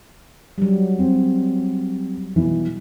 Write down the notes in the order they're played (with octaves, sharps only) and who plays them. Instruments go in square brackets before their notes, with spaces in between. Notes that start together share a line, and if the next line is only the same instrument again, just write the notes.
[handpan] F#3 G3
[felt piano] C4
B2 E3